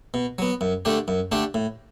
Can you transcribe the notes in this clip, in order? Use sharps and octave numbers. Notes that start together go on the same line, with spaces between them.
B2
F#3 B3
F#2
D3 A3 D4 G4
F#2
D3 A3 D4 G4
A2